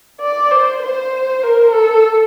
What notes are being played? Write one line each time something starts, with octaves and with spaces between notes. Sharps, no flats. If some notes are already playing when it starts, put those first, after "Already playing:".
D5
C5
C5
A#4
A4